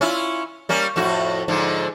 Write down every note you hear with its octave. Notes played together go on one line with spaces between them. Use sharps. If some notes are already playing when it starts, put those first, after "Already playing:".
C#4 E4 F4
G3 A#3 C#4
F2 A2 F#4
G#2 D3 F3